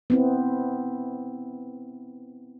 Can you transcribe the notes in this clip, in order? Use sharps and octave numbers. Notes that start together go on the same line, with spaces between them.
B3 C4 E4